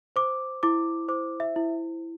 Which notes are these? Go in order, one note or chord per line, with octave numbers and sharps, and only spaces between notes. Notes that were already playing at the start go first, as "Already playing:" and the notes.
C5 D6
E4 D6
C5 D6
E5
E4